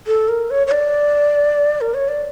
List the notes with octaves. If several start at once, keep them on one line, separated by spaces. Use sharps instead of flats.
A4
A#4
C#5
C#5
D5
A#4
C#5
D5